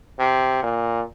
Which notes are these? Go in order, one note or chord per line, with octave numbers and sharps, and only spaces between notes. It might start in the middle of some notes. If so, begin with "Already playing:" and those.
C3
A#2